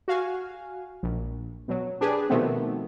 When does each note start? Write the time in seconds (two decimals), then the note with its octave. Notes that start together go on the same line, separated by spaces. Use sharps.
0.08 F#4 F5 G#5
1.03 A#1
1.68 B2 F#3
2.01 D4 G4 G#4 B4
2.29 B2 D#3 F3 A3 B3 C4